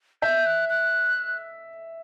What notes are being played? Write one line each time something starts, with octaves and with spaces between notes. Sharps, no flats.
E5 G6
F#6
F#6